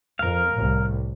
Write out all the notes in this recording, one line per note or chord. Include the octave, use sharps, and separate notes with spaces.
F2 A#4 F5
C2 A2